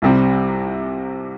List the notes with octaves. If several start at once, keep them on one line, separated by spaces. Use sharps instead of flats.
C2 C3 G3 C4